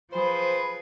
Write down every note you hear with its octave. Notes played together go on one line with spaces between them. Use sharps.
F3 G#4 B4 C5 B5